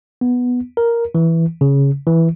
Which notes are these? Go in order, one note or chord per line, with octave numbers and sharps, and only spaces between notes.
B3
A#4
E3
C#3
E3